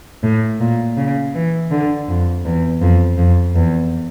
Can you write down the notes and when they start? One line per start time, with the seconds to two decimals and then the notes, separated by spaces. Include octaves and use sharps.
0.23 A2
0.60 A#2
0.97 C#3
1.35 E3
1.71 D3
2.09 F2
2.45 E2
2.82 F2
3.18 F2
3.56 E2